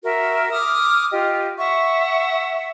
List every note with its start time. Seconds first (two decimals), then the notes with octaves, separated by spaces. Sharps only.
0.04 F#4 A#4 E5
0.51 D6 D#6 F6
1.11 F4 G4 D#5
1.58 E5 F#5 C#6